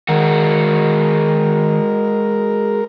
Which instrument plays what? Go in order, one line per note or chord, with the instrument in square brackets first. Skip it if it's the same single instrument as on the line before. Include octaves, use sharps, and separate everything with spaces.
[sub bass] D#3 [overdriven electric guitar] G#3 F#4 [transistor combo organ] A#4